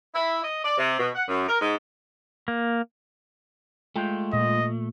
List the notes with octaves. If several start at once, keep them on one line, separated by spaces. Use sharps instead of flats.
E4
D#5
D5
C3
B2
F#5
F#2
A#4
G#2
A#3
G#3 A3 F4 G5
A#2 D#5